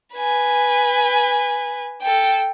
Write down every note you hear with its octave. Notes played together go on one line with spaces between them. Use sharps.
B4 G#5
A4 G5